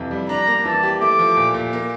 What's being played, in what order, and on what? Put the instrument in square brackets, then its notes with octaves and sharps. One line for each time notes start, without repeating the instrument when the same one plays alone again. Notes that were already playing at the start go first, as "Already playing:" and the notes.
Already playing: [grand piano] F2 C3 E3
G3
[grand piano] D4 [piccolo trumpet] A#5
[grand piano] A#3
[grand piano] E3 [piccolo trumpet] A5
[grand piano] G4
[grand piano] A3 [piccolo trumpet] D6
[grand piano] F3
A#2
A#2
A#3